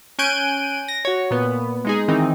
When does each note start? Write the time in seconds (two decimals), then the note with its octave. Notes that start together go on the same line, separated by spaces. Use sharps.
0.19 C#4 G#5 F#6 G6 D7 D#7
0.88 A#6
1.05 F#4 C#5
1.31 A#2 B3
1.85 G#3 D#4 G#4
2.08 D#3 E3 C4 D#4